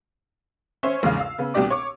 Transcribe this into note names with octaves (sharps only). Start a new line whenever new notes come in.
C#4 C5 C#5 E5
A#1 E2 G#2 C#3 F5 F6
F5 E6
C#3 B3
C2 B2 D4 G4 D5 D6
C#5 C#6 D6